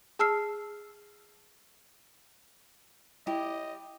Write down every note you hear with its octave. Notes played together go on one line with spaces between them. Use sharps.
G#4 A5 E6 F6 C7
E4 G4 D#5